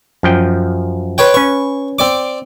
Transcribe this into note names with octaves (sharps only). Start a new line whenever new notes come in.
F#2 F3 G5
B4 C#5 G5
C#4 B4 C#6
C4 D5 D6